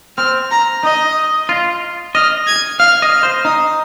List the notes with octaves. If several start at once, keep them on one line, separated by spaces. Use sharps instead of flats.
C4 F6
A#5
D#4 D#5
F4
D#5 F6
G#6
F5 F6
D#5
F6
C5
D#4 D#6